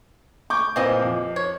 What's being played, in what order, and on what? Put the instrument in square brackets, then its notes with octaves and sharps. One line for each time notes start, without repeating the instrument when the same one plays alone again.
[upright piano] C#6 D6 G6
[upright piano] A#2 C4 F4 [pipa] E3 G3 D#5
[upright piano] F2
[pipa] C#5